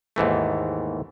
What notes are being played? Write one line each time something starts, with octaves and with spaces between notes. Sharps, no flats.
D#2 G#2 E3 A3